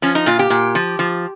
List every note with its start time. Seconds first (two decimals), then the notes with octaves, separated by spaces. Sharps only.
0.02 F3 C#4
0.15 D#4
0.26 A#2 F4
0.39 G4
0.50 A#2
0.75 F3
0.99 F3